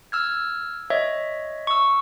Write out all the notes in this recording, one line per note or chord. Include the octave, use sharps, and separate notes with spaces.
E6 F6 G#6
C#5 D#5 E5
C#6 E6